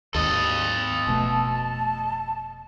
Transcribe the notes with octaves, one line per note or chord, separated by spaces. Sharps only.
D#2 G#2 A4 D#5
F1 B2 A3 A5